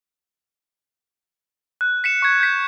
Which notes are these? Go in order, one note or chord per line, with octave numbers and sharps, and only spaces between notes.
F#6
B6 C#7 E7
C#6 G#6
G6 B6